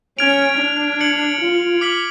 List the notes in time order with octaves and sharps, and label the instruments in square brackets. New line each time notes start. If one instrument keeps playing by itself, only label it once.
[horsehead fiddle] C#4 [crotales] F6 G#6 D7 F7
[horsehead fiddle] D4
[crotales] G#6 C#7 F#7
[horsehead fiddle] F4
[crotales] D6 F6 B6 F#7